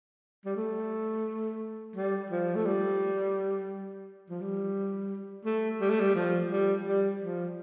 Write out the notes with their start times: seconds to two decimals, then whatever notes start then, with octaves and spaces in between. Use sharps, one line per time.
0.46 G3
0.56 A3
1.96 G3
2.30 F3
2.56 A3
2.66 G3
4.30 F3
4.41 G3
5.45 A3
5.81 G3
5.90 A3
6.00 G3
6.15 F3
6.50 G3
6.85 G3
7.20 F3